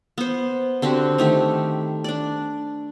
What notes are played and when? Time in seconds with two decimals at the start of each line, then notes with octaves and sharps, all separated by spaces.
0.18 B3 C5
0.82 D3 C4 F#4 G4
1.18 D#3 A3 G4
2.04 D4 D5